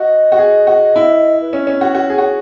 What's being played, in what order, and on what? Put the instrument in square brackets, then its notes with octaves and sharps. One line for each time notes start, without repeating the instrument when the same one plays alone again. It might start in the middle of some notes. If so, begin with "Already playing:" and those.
Already playing: [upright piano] F#4 [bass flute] D#5
[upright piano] F#4
G#4
F#4
E4
[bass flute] B4
[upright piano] C#4 [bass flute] C#5
[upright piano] C#4
F#4
F#4
G#4
F#4